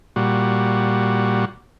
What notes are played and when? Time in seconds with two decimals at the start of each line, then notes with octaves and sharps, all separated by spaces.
0.16 A#2 G3 F#4